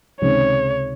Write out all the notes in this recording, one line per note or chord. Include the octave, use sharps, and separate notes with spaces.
C#2 C3 D#3 G#3 C4 C#5